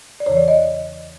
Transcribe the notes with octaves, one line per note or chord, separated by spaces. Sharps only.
D5
E2 C#3 E3 C#5
D5
D#5